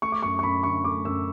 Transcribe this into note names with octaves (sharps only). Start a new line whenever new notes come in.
A3 C#6
D6
F#2 C#6
C#6
F#2 B5
D3 C#6
A3 D6
F#2 E6